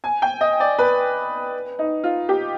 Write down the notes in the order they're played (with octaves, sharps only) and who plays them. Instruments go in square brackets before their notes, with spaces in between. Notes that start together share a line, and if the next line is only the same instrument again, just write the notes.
[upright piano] G#5
G5
D#5
D5
B4
D#4
F4
G4